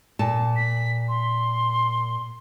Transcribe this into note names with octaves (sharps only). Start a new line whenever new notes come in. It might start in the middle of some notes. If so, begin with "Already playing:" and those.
A#2 A5
B6
C6